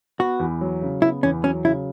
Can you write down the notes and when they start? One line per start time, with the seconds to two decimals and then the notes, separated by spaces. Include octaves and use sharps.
0.19 B3 F#4
0.39 E2
0.61 F#3
0.82 C#3
1.02 B3 E4
1.23 E2 C#4
1.44 F#3 C#4
1.65 C#3 E4